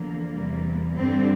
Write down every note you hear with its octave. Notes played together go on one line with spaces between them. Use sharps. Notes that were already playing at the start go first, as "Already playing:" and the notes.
Already playing: E2 D3 F3 A#3
E2 C3 G3
G2 D3 G3 C4